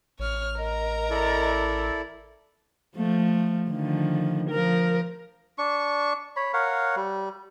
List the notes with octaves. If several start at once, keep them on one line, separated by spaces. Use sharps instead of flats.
A1 C#5 F6
A#4 D#5 A#5
E4 A4 D5
F3 A3
D3 D#3 F3
F3 A#4
D4 C#6
C#5 B5
A#4 C#5 F5 F#5
G3